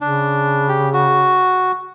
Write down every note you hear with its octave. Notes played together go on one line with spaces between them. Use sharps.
C#3 D4
G4
F#4